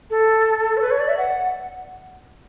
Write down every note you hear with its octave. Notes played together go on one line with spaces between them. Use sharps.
A4
C#5
B4
C#5
D5
E5
F#5